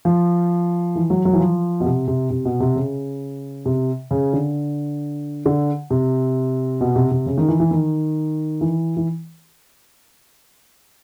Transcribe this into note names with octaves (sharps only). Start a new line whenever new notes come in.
F3
E3
F#3
F#3
E3
F3
B2
C3
C3
C3
B2
C3
C#3
C3
C#3
D3
D3
C3
B2
C3
C3
C#3
D#3
E3
E3
D#3
E3
E3